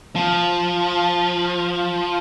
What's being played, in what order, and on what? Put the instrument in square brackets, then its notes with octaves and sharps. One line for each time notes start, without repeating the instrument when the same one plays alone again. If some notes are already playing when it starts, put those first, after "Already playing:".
[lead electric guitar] F3